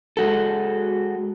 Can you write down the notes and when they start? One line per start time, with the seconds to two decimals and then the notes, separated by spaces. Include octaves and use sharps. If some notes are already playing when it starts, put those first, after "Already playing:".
0.17 G#3 F#4 A4